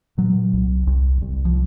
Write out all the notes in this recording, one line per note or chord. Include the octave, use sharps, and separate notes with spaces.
A#2 F#3
C2
C2
C2
F3